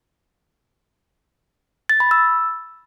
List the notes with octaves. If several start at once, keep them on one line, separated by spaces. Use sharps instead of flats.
A6
B5
E6